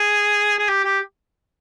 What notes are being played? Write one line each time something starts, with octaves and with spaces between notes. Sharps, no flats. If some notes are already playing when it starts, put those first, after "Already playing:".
Already playing: G#4
G#4
G4
G4